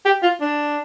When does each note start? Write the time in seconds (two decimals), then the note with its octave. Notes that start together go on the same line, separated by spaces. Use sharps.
0.05 G4
0.22 F4
0.41 D4